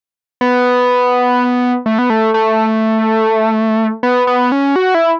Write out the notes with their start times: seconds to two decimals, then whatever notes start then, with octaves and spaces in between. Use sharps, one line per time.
0.41 B3
1.86 A3
1.99 B3
2.10 A3
2.34 A3
4.03 B3
4.27 B3
4.52 C#4
4.76 F#4
4.95 E4